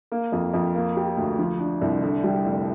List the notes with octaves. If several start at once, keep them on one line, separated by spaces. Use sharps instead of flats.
A#3
F2
F2
A#3
G4
D2
F3
D4
C2
D3
G3
F1